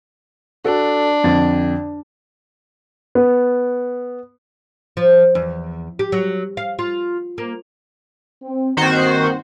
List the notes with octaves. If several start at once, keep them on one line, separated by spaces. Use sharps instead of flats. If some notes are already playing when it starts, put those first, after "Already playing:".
D4 F#4 A4
F2 D3 A6
B3
F3
E2
G4
F#3
F5
F4
A#3
C4
G2 D#3 A#3 C4 F#4 C5